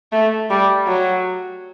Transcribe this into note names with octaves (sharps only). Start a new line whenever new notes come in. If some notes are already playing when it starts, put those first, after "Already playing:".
A3
G3
F#3